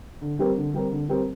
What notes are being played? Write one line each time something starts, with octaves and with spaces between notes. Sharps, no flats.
D3
G3 C4 G4 A#4
D3
G3 C4 G4 A#4
D3
G3 C4 G4 A#4